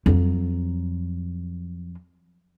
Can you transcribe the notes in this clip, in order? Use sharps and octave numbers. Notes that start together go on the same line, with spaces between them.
F2 F#3